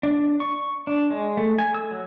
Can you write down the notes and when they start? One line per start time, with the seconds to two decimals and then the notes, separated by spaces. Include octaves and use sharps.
0.03 D4
0.40 C#6
0.87 D4
1.10 G#3
1.37 A3
1.58 G#5
1.74 E6
1.91 F#3